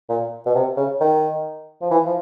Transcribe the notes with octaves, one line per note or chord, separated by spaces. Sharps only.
A#2
B2
C3
C#3
D#3
F3
E3
F3